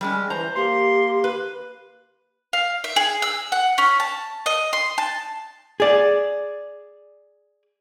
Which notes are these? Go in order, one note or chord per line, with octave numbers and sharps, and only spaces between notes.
G3 G#3 C#4
E3 C5 A#5
A#3 G4 C6
B4
F5
E5
G#4
E6
F#5
C#4
A5
D#5
C6
A5
G#4 D5